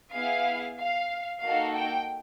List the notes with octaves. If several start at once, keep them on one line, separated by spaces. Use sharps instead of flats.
B3 E4 G#4 F5
F5
A#3 D#4 F#4 A4 F5
G5